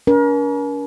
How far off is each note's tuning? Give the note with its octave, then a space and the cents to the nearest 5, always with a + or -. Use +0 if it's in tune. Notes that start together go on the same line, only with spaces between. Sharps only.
C#4 +45 A#4 +35